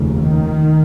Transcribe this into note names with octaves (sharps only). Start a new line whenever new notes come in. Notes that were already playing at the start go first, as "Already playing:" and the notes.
Already playing: F1 D#2 C#3
D#3